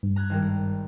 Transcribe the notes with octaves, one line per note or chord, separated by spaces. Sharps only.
G2
A#5 F#6 G#6
G#1 G3 A#4